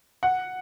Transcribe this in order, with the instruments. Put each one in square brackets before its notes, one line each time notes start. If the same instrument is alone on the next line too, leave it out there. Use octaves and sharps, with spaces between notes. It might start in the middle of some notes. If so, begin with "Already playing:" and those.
[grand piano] F#5